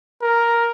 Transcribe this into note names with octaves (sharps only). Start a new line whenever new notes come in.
A#4